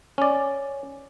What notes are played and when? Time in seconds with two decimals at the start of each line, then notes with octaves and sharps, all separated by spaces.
0.18 C#4 D5